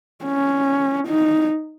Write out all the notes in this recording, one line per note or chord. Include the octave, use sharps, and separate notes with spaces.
C#4
D#4